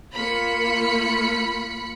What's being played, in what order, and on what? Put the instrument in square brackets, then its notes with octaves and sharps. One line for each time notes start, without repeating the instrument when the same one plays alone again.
[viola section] A#3 F4 [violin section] B5 C#7